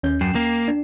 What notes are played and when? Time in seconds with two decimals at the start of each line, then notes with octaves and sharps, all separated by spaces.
0.03 D#2 C#4 G6
0.21 F#2 G5 C7 E7
0.35 A#3
0.68 D4